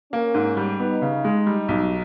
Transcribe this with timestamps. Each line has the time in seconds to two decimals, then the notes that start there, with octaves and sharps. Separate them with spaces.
0.12 A#3 C#4
0.34 G#2
0.57 G3
0.80 B3 D#4
1.02 C#3
1.25 G#3
1.47 G3
1.68 B1